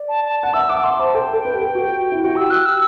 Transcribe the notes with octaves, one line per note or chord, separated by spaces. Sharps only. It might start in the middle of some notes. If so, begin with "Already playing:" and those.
Already playing: D5
A5
A5
F#5 A5
E5 E6
F#5 D6
E5 C6
C5 A5
A4 G5
A4
B4
G4
A4
F#4
E4
F#4
G4 E6
F#6
E6